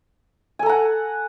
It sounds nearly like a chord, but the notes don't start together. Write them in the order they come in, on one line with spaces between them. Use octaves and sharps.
G#5 A4 A#5 F#5